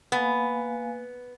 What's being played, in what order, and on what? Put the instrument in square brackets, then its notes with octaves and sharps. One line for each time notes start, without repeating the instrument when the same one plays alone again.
[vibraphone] A#3 F5 G#5 [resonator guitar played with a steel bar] B3